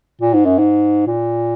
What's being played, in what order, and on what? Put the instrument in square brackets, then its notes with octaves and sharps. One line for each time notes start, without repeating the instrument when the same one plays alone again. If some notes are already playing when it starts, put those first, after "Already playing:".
[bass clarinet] A#2
G#2
F#2
G#2
A#2